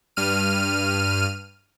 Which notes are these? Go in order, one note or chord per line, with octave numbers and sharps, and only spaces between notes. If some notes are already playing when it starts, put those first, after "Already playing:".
G2 F6 D#7